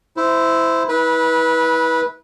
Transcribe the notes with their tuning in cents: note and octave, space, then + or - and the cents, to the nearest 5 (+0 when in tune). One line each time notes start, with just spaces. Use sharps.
E4 +0 C5 -20
E4 -35 B4 -15